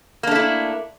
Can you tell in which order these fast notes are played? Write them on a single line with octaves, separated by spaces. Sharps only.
A#3 D4 A3 E4